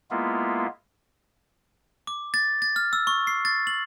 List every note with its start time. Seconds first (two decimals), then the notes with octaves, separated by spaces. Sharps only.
0.11 G#3 A#3 B3 E4 F4
2.07 D6
2.34 A6
2.62 A6
2.76 F6
2.93 E6
3.07 C#6
3.27 C7
3.45 A6
3.67 F#7